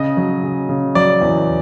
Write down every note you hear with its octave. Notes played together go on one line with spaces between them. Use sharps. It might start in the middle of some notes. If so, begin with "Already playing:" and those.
Already playing: C#3 D#5
F#3
C#3
C#3
F#3 D5
E2